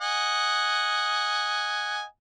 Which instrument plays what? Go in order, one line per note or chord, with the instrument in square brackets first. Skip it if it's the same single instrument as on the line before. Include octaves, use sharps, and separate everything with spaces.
[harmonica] D#5 F#5 G#5